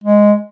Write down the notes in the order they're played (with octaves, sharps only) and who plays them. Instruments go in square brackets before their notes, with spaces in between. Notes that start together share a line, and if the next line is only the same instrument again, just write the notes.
[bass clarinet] G#3